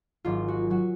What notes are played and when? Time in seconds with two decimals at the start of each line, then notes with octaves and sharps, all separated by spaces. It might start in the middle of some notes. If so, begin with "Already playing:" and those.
0.25 G#1 G#2 F#3 F4
0.48 F#4
0.70 F#3 F#4